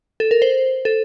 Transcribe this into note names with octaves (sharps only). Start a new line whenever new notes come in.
A4
A#4
C5
A4